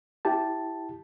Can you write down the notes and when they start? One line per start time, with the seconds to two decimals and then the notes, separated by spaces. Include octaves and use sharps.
0.25 E4 G4 A5